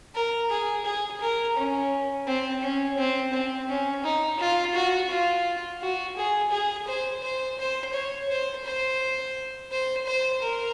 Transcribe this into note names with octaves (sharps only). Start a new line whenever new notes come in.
A#4
G#4
G#4
A#4
C#4
C4
C#4
C4
C4
C#4
D#4
F4
F#4
F4
F#4
G#4
G#4
C5
C5
C5
C#5
C5
C5
C5
C5
A#4